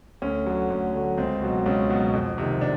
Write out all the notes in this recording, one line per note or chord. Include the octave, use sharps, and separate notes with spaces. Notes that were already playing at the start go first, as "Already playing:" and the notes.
D2 C#4
D3 F#3
D2
D3 F#3
C#2 C4
B2 F#3
C#2 C#4
B2 F#3
F2
C3 D#3
D4